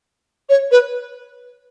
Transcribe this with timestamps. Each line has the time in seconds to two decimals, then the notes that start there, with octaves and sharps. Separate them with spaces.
0.49 C#5
0.71 B4